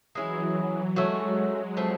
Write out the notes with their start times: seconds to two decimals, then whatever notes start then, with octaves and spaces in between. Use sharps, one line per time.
0.15 E3 F#3 G#3 C#4 E4 G#4
0.96 F#3 G#3 A3 C#4 F#4
1.77 F3 A3 C4